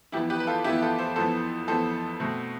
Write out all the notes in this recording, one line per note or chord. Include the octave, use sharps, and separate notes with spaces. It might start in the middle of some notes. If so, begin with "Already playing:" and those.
F2 E3 B3 E4 G4
G4 B4
B4
F4 A4
F2 E3 B3 E4 G4
F4 A4
A4 C5
F2 E3 B3 A4 C5
F2 E3 B3 A4 C5
B2 A3 C4